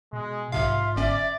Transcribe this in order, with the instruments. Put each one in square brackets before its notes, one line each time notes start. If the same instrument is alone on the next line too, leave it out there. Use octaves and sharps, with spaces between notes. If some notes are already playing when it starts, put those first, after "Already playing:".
[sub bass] B2 [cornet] G#3
[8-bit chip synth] B1 C3 F5 [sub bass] G#2 [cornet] F4 [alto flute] E5
[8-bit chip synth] G1 C#4 [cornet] D5